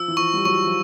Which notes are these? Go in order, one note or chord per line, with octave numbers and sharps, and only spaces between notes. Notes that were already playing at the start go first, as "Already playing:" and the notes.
Already playing: F3 E6
E3
F3 C#6
G3
F#3 C#6
F3